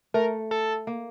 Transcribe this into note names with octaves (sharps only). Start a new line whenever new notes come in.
A3 A#4
A4
A#3